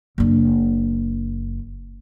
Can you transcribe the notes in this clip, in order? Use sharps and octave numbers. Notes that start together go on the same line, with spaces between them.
F#1 D4